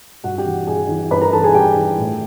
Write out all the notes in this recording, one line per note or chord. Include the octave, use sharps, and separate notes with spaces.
G2 F#4 F#5
G4 G5
E3
G2 G#4 G#5
E3
G2 B4 B5
A#4 A#5
E3 A4 A5
G#4 G#5
G2 G4 G5
E3
A2